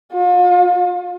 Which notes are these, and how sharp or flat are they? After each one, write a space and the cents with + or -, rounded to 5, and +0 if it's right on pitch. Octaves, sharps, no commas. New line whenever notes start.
F4 +40